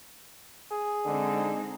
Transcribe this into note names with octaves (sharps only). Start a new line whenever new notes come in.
G#4
D3 G#3 C4 D#4